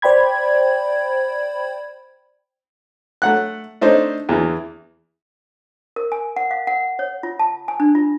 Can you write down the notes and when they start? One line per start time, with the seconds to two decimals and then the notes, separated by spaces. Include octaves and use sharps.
0.02 C5 D5 G5 B5 G#6
3.22 A3 F#5 F#6
3.81 A3 D4 D#4 C5
4.29 E2 E3
5.96 A#4
6.12 G#5
6.36 F#5
6.51 F5
6.67 F#5
6.99 C#5
7.23 F4
7.39 A5
7.68 G#5
7.80 D4
7.95 F4